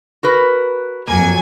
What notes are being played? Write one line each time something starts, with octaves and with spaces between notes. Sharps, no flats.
F#4 A#4 B4
F2 F#3 A#3 G#5